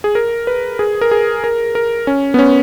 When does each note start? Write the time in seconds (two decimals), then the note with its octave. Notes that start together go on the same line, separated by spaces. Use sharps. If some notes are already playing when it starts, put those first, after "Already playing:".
0.04 G#4
0.15 A#4
0.47 B4
0.79 G#4
1.01 A#4
1.11 G#4
1.44 A#4
1.75 A#4
2.07 C#4
2.34 B3
2.39 C#4